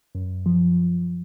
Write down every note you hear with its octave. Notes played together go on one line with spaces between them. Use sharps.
F#2
F3